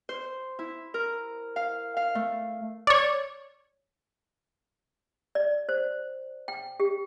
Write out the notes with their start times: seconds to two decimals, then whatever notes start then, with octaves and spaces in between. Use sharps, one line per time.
0.09 C5
0.59 E4
0.94 A#4
1.56 F5
1.97 F5
2.15 A3
2.87 C#5 D5
5.35 D5
5.69 C5
6.48 G5
6.80 G4